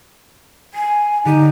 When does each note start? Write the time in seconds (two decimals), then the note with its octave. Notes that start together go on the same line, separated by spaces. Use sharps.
0.74 G#5 C7
1.25 D3 D#4 G4 D#7